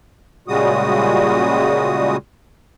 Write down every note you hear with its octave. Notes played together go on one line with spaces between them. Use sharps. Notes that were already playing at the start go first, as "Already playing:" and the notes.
A#2 C#3 G3 G#3 F#4 D#6